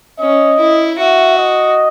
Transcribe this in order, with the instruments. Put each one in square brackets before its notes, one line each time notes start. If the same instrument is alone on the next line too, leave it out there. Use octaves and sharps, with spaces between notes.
[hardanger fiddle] C#4 [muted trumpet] D#5
[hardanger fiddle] E4
[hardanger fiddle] F#4 [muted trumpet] E5
[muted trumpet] D#5